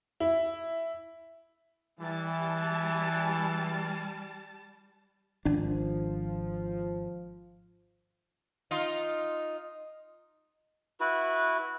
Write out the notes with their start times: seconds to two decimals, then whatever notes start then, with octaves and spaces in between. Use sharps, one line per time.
0.20 E4
1.99 E3 G3 A5
5.45 G#1 F3 D4
8.71 D#4 F4
11.00 E4 F#4 B4